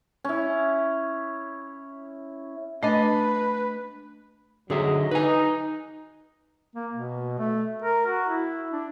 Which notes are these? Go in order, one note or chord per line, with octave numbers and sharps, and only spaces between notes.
C#4 E4
A3 D4 B4 D#5 G#5 A6
G#2 D3 F#3 G#4 D#5 E5
D#4 B4 G#5
A#3
B2
A3
A#4
F#4
E4
D4